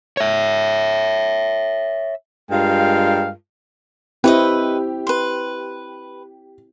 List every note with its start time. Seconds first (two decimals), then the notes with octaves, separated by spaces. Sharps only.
0.17 C#5 E5
2.51 G2 G#3 F4 A#4 F5 G5
4.24 C4 E4 G4 B4 C#5 D#5
5.07 B4 C6